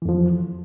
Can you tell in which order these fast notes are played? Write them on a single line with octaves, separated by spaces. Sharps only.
E3 F2 F3